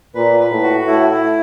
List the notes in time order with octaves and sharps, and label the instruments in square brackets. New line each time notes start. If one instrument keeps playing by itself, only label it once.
[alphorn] A#2 [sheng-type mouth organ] B4
[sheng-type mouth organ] B4
[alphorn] A2
[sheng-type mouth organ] F#4
[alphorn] A2 [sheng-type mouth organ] E4
[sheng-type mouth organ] E4